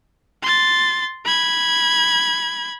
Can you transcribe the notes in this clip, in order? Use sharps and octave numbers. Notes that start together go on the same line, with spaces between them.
C6 A6
B5 G#6